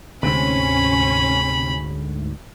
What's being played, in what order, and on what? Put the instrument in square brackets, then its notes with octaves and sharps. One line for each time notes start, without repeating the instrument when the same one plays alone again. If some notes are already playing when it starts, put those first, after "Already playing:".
[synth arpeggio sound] D2 G#2 [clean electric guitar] C3 C4 [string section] C#4 [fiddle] B5